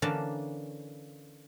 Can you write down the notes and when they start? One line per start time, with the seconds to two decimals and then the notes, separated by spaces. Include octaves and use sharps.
0.02 D3 E3 A#3 C#4 D5 A5